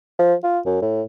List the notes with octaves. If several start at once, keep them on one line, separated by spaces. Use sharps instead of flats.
F3
F4
F#2
A2